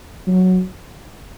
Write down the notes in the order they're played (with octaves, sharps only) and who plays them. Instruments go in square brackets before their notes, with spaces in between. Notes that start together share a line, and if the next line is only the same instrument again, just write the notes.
[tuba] F#3